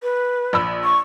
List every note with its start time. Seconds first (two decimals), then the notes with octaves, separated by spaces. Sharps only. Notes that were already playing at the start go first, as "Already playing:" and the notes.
0.03 B4
0.53 A#1 B5 E6
0.84 C#6